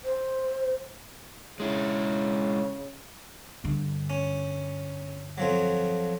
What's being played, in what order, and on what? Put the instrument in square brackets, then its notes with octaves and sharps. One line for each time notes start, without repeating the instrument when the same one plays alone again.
[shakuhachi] C5
[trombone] C#3 [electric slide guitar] G#3 E4
[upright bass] G2 D3
[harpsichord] C#4
F2 F3 F#3